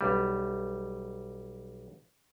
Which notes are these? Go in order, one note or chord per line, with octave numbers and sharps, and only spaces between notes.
B1 G3